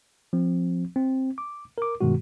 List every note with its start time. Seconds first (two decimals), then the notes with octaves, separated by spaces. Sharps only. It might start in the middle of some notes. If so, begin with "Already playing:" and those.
0.33 F3 C4
0.96 C4
1.38 D6
1.78 A#4 D6
2.01 G2 B2 D#3 G#3 F#4